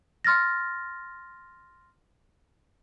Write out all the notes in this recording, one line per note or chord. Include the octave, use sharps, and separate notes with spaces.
C6 F6 A6 A#6